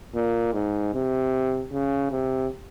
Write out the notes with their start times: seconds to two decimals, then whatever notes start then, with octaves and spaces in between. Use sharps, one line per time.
0.15 A#2
0.54 G#2
0.94 C3
1.73 C#3
2.12 C3